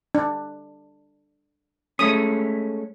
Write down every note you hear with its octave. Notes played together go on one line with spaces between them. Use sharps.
D4
G#3 A3 C#4 D#6